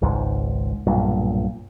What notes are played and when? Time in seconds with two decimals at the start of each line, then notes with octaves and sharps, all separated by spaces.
0.02 G#1 C#2 G#2
0.87 B1 G2 A#2